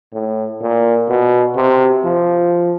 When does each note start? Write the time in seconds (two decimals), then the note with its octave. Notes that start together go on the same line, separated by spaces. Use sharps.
0.13 A2
0.61 A#2
1.09 B2
1.56 C3
2.04 F3